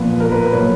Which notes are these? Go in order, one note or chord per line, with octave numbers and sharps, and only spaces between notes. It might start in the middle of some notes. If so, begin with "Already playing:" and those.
Already playing: A#2 F3 B3 B4
A#4
B4
B2 F#3 A#3 C#5